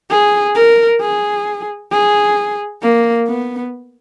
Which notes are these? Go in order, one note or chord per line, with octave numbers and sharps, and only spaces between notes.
G#4
A#4
G#4
G#4
A#3
B3